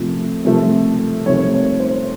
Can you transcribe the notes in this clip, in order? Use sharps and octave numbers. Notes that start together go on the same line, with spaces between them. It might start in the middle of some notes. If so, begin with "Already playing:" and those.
Already playing: C3 F3 A3
C3 F3 A3
C3 F3 A3 C#5
C#5
C5